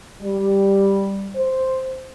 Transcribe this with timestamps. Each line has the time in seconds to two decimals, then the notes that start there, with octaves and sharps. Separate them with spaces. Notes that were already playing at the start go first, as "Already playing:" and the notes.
0.22 G3
1.35 C5